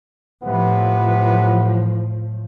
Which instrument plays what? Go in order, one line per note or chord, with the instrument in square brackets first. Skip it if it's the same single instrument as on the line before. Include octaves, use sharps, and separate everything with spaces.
[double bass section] A2 F3 [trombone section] C3 B3 B4